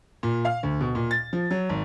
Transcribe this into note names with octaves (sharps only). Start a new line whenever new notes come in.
A#2
F5
D2
B2
A#2
A6
F3
F#3
G#1